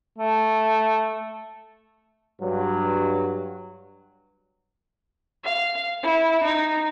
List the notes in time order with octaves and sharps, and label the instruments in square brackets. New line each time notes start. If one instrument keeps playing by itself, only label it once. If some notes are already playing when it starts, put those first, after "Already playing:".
[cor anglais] A3
[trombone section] G2 F#3
[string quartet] F5
E4
D#4